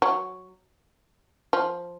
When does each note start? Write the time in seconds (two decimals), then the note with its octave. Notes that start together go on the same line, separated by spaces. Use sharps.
0.02 F#3
1.53 F3